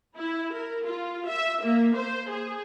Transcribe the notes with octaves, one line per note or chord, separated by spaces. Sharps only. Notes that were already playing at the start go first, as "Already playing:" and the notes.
E4
A#4
F4
E5
A#3
C5
G#4